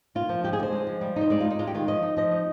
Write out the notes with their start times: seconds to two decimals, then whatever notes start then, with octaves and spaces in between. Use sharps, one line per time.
0.15 A#3 F4
0.29 F3
0.43 G#3 G4
0.53 G#4
0.59 D3 C5
0.72 G#3
0.87 F3
1.01 G3
1.16 D#4 C5
1.30 G#3 D5
1.40 D#4 F4
1.50 D#4
1.59 G#3 F4
1.67 G4
1.74 D#3 F4
1.88 F3 D#5
2.03 D#4
2.17 F3 D#5
2.31 D#4